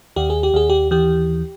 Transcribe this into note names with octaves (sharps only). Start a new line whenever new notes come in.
D#2 G4
G#4
G4
D#2 G#4
G4
E3 G4